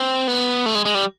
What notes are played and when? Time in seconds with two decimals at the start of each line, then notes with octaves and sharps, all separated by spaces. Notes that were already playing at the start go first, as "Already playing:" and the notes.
Already playing: C4
0.27 B3
0.66 A3
0.75 G#3
0.85 G#3
0.95 G3